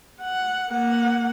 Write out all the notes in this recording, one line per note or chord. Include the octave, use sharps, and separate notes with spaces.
F#5
A#3 F#5